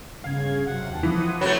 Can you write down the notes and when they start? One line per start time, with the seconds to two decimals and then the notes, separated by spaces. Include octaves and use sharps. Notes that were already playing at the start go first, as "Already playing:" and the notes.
0.24 G1 C#3 F5 G#6
0.67 C3 F#3 F#5
0.90 D#2 G5 A5
1.03 E3 F3 D#6
1.41 F#3 A3 B4 B5